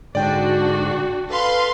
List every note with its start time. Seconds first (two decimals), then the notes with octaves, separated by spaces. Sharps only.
0.15 G#2 D3 D4 F#4 D5 G5
1.30 A4 B4 F5 C6